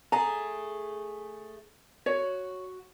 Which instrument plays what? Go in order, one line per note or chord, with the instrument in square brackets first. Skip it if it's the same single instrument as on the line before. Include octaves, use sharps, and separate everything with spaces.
[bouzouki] A3 G#4 [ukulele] A#5
[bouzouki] F#4 [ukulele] C#5